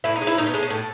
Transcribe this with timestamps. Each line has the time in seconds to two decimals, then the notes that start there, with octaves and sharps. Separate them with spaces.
0.04 A2 E4
0.16 D#4
0.21 G#3
0.27 E4
0.38 A2 D#4
0.47 B3
0.54 G#3 A3
0.63 C#4
0.70 A2 A4